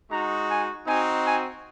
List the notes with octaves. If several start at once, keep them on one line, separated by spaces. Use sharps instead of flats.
G#3 D#4 F#4 A#5
G#5
C4 D#4 F#4 G#5
G#5